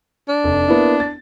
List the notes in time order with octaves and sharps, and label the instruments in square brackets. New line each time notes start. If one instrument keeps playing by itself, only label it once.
[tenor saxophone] D4
[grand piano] F1
A#3 B3 E4
A6